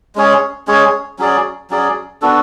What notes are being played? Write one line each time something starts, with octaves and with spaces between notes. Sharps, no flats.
G#3 C#4 G#4 C#5
G#3 C#4 G#4 C#5
F#3 C#4 G#4 D5
F#3 C#4 G#4 D5
B3 D4 F#4 A4